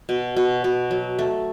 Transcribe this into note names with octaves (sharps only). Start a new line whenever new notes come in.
B2
B2
B2
F#3
A3